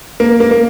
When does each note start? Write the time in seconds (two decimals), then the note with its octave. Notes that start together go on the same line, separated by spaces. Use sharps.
0.20 A#3
0.40 A#3
0.51 A#3